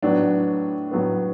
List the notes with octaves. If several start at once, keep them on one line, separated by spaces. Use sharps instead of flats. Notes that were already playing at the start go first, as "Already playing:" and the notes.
A2 F#3 B3 D4
A2 F#3 B3